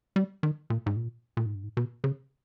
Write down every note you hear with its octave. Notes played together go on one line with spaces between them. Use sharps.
G3
D#3
A#2
G#2
A#2
A#2
G#2
G2
G#2
B2
C#3